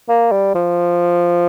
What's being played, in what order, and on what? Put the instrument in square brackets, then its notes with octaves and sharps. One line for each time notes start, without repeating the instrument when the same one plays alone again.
[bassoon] A#3
G3
F3